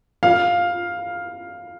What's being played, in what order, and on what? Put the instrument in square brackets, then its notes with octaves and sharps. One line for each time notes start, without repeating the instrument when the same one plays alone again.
[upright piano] F5